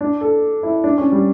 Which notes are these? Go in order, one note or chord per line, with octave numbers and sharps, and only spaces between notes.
D4
A4
E4
D4
C#4
G3